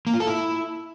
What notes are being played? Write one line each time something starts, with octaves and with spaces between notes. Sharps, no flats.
A#3
F4
A4
E4